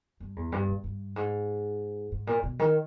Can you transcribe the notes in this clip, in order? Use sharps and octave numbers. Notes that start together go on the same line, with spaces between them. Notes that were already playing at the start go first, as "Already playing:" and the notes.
G2
E2
G2
A#2
G2
G#2
G#2
A#2
B2
D#3